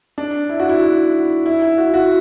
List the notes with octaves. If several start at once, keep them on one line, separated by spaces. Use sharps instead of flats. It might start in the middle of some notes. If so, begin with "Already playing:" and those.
D4
E4
F#4
E4
E4
E4
E4
F#4
F#4